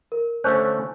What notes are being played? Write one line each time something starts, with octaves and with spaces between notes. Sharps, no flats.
A#4
D3 A3 C#4 C5 F#6 G6